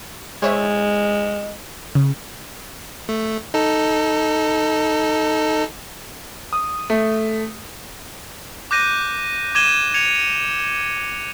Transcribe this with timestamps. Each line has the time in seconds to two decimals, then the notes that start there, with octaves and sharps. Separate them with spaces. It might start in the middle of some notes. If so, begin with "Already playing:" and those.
0.42 G#3 C5 C#5 E5
1.95 C#3
3.09 A3
3.54 D#4 A4
6.53 D#6
6.90 A3
8.71 D6 F#6 G6 A#6 D#7
9.55 D6 G6 G#6 D#7 E7 G7
9.94 G#6 C#7 F7